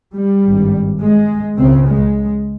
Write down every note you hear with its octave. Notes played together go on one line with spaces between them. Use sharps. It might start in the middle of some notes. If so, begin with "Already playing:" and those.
G3
G#1 G2
G#3
C#2 C#3 C4
G#3